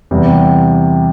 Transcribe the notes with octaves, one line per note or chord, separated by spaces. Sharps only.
E2 C3 G3